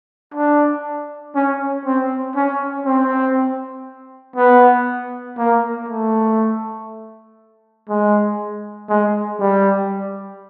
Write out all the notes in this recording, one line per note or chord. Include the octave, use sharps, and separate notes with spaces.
D4
C#4
C4
C#4
C4
B3
A#3
A3
G#3
G#3
G3